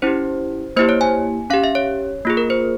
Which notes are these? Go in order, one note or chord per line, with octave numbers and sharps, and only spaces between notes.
C#4 E4 G4 C5
A#3 E4 G4 C5
C#5
G#5
C#4 G4 F5
E5
C#5
A#3 F4 G#4
A#4
C5